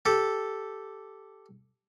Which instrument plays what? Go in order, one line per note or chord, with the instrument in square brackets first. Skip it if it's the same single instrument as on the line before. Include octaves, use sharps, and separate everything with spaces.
[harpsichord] G4 A4